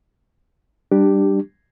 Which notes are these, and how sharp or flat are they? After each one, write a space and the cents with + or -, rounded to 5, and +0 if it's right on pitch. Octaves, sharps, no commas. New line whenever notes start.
G3 +0 D4 +15 G4 +0